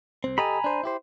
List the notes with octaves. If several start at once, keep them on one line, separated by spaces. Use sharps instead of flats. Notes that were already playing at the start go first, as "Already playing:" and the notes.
C2 C4
G4 A4 D#5 G#5 A#5 B5
D4 C5
E4 G4 C5